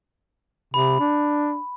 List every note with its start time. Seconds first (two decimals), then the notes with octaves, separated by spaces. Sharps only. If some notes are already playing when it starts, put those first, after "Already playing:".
0.74 C3 B5
1.00 D4